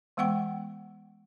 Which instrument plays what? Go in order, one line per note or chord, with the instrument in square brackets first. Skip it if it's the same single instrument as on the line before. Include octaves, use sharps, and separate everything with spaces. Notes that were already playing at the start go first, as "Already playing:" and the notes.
[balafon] E3 G#3 B3 F#5 G5 C#6